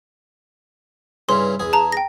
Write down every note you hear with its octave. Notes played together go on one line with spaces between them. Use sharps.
G2 C#3 E3 C6
E2 G#4
A5 A#5
G5 A#6